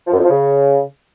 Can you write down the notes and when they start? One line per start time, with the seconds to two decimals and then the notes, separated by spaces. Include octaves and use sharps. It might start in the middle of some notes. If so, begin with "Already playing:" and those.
0.07 F3
0.13 F#2
0.19 F2
0.24 F3
0.30 C#3